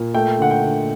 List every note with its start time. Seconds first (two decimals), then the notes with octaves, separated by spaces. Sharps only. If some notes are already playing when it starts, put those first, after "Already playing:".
Already playing: A#2
0.14 A3 G5
0.38 D3 F#5
0.51 G5
0.62 D3